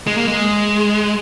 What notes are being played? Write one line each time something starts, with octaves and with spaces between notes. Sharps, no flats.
G#3
A#3
G#3